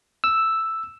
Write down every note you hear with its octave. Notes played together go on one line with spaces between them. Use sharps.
E6